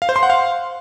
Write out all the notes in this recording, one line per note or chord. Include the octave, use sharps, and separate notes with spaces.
F5
C5
C6
F#5
F5